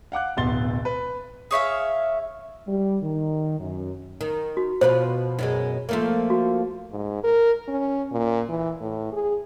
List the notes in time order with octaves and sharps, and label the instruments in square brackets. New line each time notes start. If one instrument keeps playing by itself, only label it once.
[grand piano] F5 F#5 D6 F#6
D1 B1 B3 C6 A6 G7
B4
[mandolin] G#4 C#5 E5 F5
[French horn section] G3
D#3
F#2
[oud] D#3
[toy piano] F#4
[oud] B2 F3 B4 [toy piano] C5
[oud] F#2 B2 G#3
F3 A3 A#3
[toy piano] F#4
[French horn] G#2
A#4
C#4
A#2
E3
A2
G#4